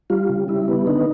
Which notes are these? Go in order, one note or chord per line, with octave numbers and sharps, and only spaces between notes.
G3 F4
C#3
G3 E4
B3
D3 D#4